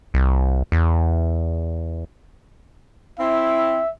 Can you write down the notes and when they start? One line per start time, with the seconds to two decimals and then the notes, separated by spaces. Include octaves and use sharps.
0.14 C2
0.72 E2
3.20 C4 E4 E5